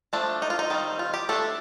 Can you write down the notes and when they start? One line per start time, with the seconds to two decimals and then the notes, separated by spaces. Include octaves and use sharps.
0.13 F3 A3 D4
0.42 D#4
0.50 F4
0.59 D#4
0.70 D#3 G3 C4
0.99 F4
1.14 G4
1.29 A3 D4 A4